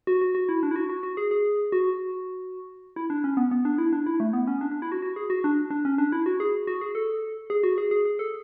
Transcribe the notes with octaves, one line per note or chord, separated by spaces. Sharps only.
F#4
F#4
F#4
E4
D4
E4
F#4
F#4
F#4
G#4
G#4
F#4
E4
D4
C#4
B3
B3
D4
E4
D4
E4
A3
B3
C#4
D4
D4
E4
F#4
F#4
G#4
F#4
D4
D4
C#4
D4
E4
F#4
G#4
F#4
G#4
A4
G#4
F#4
G#4
G#4
G#4
A4